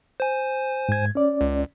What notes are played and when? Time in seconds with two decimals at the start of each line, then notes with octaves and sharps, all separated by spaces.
0.20 C5 G#5
0.89 G#2 G#6
1.15 C#4 D5
1.41 C#2